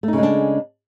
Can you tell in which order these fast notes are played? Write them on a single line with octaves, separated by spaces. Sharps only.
A3 D#4 C#3 G#3 D4